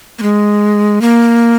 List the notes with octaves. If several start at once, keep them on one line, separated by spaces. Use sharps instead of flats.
A#3
G#3
A#3